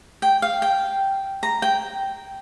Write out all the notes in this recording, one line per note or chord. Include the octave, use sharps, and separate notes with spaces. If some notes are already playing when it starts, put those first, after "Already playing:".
G5
F5
G5
A#5
G5